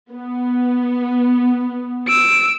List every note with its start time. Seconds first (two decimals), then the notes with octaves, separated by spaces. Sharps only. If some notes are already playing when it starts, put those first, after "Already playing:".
0.12 B3
2.08 E6 D7